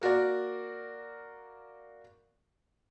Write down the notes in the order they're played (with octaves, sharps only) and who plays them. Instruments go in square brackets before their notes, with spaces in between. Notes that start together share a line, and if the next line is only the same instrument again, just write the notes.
[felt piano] A#3 F#4 A#4 D5